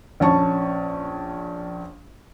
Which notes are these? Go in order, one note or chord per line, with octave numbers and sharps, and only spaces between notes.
A#1 C#4 A5 C#6